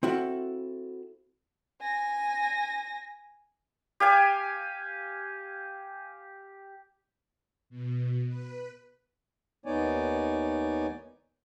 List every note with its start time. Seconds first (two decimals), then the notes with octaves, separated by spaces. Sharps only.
0.03 C4 E4 F#4 A4 F5
1.81 G#5 A#6
4.00 G4 F5 G#5
7.70 B2
8.28 B4
9.66 D#2 B3 D#4 C#5 D5 G#5